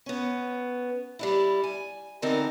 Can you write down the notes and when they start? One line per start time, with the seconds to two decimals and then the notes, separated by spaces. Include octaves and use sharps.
0.06 B3 C#4
1.19 G3 D4 E4
1.64 G#5
2.22 D3 E3 C4 D#4 A4 A#4